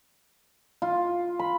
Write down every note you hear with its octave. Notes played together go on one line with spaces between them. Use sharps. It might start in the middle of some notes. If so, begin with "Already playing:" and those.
F4
B5